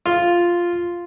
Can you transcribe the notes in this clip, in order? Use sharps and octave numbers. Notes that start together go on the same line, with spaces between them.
F4